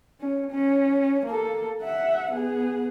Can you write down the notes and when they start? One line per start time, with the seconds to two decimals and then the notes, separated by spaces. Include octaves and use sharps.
0.20 C#4
0.51 C#4
1.25 A#3 A4
1.82 E5 F#5
2.32 B3 G#4